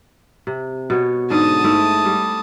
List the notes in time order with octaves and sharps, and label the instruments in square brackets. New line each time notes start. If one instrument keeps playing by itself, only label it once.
[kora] C3
B2 B3 C#5
[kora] G#2 D3 [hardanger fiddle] A5 D#6
[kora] G#2 A3 E4
G3